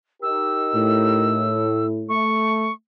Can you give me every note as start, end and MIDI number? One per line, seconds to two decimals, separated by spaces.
0.23 1.54 63
0.23 1.54 67
0.23 1.54 70
0.23 1.86 88
0.76 2.16 45
2.09 2.69 57
2.09 2.72 85